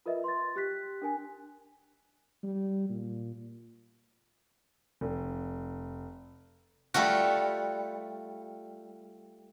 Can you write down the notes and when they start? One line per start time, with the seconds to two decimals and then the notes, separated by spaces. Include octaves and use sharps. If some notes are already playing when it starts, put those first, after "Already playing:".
0.06 F4 A#4 B4 D#5 E5
0.24 C6 A6
0.56 G4 F#6 B6
1.02 D4 A#4 G#5
2.43 G3
2.89 A#2
5.01 F1
6.94 G3 A3 F4 F#4